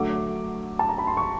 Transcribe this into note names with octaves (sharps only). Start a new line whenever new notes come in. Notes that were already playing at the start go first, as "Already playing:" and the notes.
Already playing: D3 F#3 A3 D6
A5
A#5
B5
C6
C#6